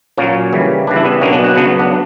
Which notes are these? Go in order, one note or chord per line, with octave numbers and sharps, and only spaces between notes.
A#2 F#3 A#3 C#4
C#3 E3 G3
C#3 E3 G3 D4
E4
B3 D4
B2 F#3 A#3 C#4
B3 D4
D4 F#4
C#3 F#3 B3
B3
B3 D4